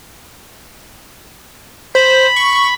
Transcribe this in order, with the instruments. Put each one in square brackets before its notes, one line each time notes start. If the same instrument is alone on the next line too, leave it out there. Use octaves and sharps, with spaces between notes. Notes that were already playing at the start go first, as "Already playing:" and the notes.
[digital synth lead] C5 [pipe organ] B5
[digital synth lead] C#6